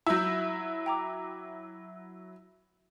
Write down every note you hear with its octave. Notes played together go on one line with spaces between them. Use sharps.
F#3 E4 E6 G6
G5 A#5 D6